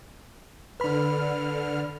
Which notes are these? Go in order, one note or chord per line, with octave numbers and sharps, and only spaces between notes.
D3 B4 B5 F6